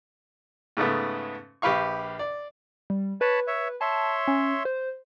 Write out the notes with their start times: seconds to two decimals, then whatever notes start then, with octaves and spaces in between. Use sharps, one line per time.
0.77 G#2 C#3 A3 B3
1.62 A#1 G4 B4 F5 C#6
2.19 D5
2.90 G3
3.21 B4 C#5 A5 B5
3.47 C#5 E5
3.81 C#5 E5 A5 C6
4.28 C#4
4.65 C5